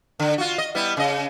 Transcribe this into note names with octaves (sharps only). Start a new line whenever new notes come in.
D3
F4 F#4
D#5
G3 B3 E4
C#3 D#5